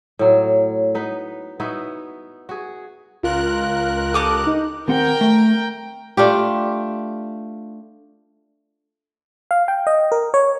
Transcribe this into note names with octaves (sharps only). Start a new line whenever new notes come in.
A2 F#3
B3 D#4 B4
B3 D#4 E4 F#4
F#4 G#4
C#2 F4 A#4 F#6
G4 A4 D6 D#6
D#4
D#2 C4 A#4 F#5 G5
A3
A3 D4 F4 G4
F5
G5
D#5
A#4
C#5